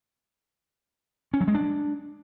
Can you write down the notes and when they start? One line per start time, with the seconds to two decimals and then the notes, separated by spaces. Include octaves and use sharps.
1.34 C#4
1.41 F#3
1.48 G#3
1.55 D4